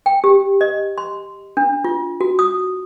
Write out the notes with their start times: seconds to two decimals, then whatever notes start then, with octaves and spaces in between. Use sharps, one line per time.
0.06 G5
0.24 G4
0.61 D#5
0.98 C6
1.57 D4
1.84 F4
2.21 F#4
2.39 D#6